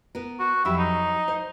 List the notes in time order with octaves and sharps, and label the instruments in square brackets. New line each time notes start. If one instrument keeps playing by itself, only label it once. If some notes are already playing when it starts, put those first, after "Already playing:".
[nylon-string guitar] B3 A#4
[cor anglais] F#4
[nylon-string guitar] F2 F#3 G4 [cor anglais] E4
[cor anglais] D#4
[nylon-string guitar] C5 D#5